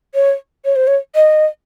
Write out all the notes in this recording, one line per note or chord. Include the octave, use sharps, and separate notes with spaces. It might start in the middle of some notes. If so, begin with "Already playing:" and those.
C#5
C#5
C5
C#5
D#5